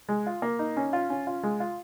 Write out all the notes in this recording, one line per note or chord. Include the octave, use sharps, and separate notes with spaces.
G#3
F4
A#3
D#4
C#4
F4
C#4
F4
G#3
F4